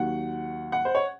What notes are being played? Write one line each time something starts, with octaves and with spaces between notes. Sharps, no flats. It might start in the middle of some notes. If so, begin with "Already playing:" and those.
Already playing: D#2 D#3 F#3 F#5
F#5
C5
C#5